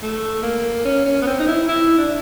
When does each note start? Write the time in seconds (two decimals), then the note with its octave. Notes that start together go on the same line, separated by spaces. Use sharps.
0.02 A3
0.43 A#3
0.85 C#4
1.06 C#4
1.22 B3
1.27 C4
1.40 D#4
1.48 E4
1.69 E4
1.98 D4